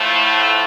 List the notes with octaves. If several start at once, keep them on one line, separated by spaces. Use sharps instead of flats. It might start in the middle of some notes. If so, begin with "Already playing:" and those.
Already playing: A2 F3 A3